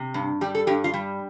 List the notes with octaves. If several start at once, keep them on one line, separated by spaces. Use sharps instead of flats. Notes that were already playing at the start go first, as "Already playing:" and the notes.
Already playing: C3
G2
G3 G4
A4
G2 G4
F4
G3